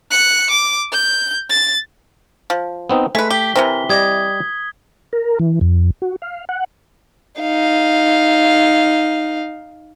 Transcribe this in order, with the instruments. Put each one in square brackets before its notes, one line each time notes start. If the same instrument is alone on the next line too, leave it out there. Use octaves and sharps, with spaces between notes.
[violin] F#6 C#7
D6
G6
A6
[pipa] F3
[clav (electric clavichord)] B3 C4 D#4
[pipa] G#3 B4 [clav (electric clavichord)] A3 [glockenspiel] B6
[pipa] G4 [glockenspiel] G7
[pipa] C3 E3 C4 [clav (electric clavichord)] A#4
[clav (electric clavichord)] G3 D5 D#5 [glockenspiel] D#6 G#6
[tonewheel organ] A#4
E3
F2
F#4
F5
F#5
[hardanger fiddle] D#4 F5